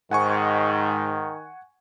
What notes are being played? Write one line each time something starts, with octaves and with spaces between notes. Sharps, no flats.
G#2 D#3 F#5 G#5 C#6